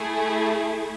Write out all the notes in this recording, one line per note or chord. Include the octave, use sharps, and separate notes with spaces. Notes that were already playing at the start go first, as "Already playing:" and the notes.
Already playing: A3 E4 G#4